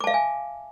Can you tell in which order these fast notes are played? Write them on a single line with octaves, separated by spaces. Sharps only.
D6 A5 F5 E5 G#5